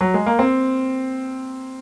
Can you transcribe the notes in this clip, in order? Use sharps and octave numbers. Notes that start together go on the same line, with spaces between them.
F#3
G#3
A#3
C4